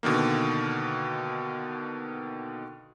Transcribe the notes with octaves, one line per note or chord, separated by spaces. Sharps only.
B2 D3 D#3 A#3